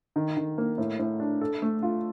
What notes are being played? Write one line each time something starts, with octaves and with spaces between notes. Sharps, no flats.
D#3
D#3
A#3
A2
A2
D4
A4
A3
F4